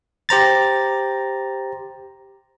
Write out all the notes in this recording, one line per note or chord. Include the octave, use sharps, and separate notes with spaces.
G4 C5 A#5 A6